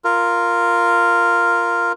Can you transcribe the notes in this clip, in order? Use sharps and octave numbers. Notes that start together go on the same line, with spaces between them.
F4 A#4